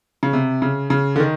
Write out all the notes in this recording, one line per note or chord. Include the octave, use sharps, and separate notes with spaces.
C#3
C3
C#3
C#3
D3
D#3